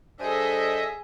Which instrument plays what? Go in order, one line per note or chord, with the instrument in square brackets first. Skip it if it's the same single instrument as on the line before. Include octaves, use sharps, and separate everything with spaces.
[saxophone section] G3 D4 A4 [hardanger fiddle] G#4 [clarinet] C5 [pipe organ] D#5 E5